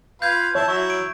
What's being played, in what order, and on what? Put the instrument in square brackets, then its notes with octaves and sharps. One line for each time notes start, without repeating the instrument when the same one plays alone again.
[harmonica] F4 B4 F5 [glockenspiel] G6 G#6
[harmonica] E4 A5 [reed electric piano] C#5
[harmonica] F#3 E4 [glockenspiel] C#6
[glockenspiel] D7